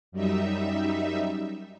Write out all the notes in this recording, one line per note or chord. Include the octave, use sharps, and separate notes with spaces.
F#2 G3 D#4 E5